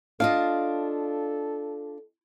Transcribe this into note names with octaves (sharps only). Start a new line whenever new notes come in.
D4 F4 A4 D#5 F5